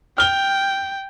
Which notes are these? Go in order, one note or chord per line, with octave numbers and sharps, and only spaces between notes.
G5 F6 G7